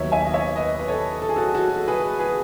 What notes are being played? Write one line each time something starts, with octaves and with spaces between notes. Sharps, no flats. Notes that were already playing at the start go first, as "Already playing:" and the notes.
Already playing: D#2 D#3 F#3 B3 C#5 E5
E5 G#5
D#5
C#5 E5
B4 D#5
B4
A4 C#5
A4
G#4
F#4 A4
F#4 A4
G#4 B4
G#4 B4